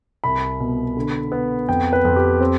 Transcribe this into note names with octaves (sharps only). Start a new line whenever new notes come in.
C2 B5
B2
D3
B3
F2 G5
B4
F2
G4
C4